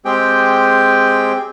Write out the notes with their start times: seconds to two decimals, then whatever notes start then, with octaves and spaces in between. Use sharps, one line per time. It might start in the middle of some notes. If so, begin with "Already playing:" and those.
0.05 G#3 C4 G4 G#4 G5